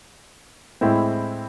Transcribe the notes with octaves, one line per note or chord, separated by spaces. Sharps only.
A2 G#3 C4 E4